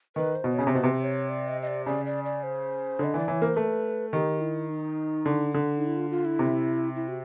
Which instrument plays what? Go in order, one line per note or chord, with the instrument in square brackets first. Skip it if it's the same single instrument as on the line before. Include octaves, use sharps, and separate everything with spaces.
[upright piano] D#3 [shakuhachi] B4
[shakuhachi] C5
[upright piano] B2
[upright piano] C#3 [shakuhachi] C#5
[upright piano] C3
[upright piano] B2 [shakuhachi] C5
[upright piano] C3 [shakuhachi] B4
[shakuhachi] C5
C#5
D5
D#5
D#5
D5
[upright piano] C#3 [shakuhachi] D5
[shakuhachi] D5
D5
C5
[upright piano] D3 [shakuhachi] D#5
[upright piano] E3 [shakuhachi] D5
[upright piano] E3 [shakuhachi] C#5
[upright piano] A#3 [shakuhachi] C5
[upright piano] A3 [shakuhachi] B4
[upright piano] D#3 [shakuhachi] G4
[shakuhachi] E4
D#4
[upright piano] D3
D3
[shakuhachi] D#4
E4
F4
F4
E4
[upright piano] C3
[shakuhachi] E4
F#4